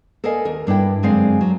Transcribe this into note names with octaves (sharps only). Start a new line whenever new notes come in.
A4 A#4 D5 D#5 F5 G#5
D#2 A#4
G2 D4 E4 G5
F#2 D3 G#3 C4 D5 F5
F#3